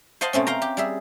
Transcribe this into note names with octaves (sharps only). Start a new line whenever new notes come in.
C5 D#5 F5 F#5 A5 C6
B2 A3 C4 C#4
F5 G5 A#5
G4
G3 G#4 E5